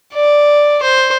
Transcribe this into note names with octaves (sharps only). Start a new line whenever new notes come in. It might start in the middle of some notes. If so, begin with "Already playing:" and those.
D5
C5